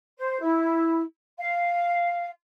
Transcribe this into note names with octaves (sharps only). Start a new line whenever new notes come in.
C5
E4
F5